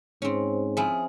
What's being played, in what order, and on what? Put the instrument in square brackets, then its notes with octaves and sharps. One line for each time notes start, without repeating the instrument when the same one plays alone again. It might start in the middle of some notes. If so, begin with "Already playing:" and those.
[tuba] G#2 [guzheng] C4 C#4
[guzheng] F3 E4 [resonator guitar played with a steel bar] G#4